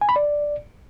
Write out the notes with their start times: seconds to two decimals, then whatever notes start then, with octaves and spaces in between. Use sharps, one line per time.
0.01 G#5
0.09 B5
0.16 D5